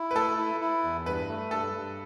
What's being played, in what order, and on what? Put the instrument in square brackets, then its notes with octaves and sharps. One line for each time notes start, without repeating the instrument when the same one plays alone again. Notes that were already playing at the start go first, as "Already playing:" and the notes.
Already playing: [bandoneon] E4
[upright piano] B4
[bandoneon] A3 [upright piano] A4
[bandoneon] E4
E4
E2
[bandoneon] G2 [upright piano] B4
[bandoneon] A3
[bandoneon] G2 [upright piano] A4
[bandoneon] G2